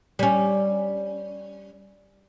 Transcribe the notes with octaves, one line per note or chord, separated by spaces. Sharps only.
G3 C#4